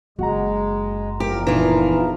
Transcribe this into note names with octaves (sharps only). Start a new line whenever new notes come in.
F#1 G#3 F#4 F#5 A#5
E2 F3 G4 A#4
A#2 E3 D4 D#4 F4